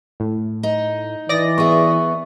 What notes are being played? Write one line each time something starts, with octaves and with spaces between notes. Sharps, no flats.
A2
D#4
E3 D5 D#5 A#6
B3 G#4 E5 C#6